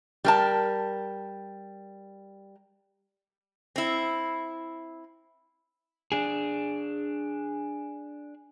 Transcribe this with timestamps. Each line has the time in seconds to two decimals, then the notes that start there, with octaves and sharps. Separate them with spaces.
0.25 G3 A#4 A5
3.76 C4 E4
6.12 D4 G#4